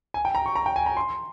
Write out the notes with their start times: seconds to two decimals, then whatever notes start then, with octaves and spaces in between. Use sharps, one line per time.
0.14 G#5
0.25 G5
0.35 A#5
0.46 C#6
0.56 A#5
0.66 G5
0.76 G#5
0.86 A#5
0.97 C6